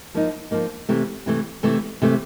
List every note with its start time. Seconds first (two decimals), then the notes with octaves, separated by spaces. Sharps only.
0.14 F3 A#3 D#4
0.51 F3 A#3 D#4
0.89 C3 E3 A3
1.26 C3 E3 A3
1.63 C3 E3 A3
2.02 C3 E3 A3